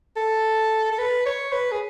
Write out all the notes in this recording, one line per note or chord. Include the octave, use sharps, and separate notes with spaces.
A4
A4
B4
C#5
B4
G#4